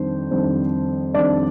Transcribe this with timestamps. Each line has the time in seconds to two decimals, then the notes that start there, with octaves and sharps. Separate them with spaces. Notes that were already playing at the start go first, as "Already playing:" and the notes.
Already playing: F2 D#3 G3 D4 C5
0.31 F2 D#3 G3 D4
1.14 F2 D#3 G3 D4 D5